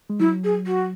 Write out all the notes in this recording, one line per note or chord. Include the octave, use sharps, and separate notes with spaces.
G#3
F#3 E4
G#4
F#4